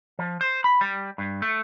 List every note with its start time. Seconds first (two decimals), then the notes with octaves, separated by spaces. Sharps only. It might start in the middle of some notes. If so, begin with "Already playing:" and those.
0.19 F3
0.41 C5
0.64 B5
0.81 G3
1.18 G2
1.42 A3